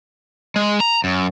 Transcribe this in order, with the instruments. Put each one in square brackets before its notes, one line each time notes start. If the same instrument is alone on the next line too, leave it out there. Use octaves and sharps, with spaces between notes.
[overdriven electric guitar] G#3
A#5
F#2